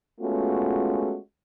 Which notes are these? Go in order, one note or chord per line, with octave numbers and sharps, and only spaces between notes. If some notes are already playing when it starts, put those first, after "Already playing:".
G#3 A3 B3 C#4 F4 F#4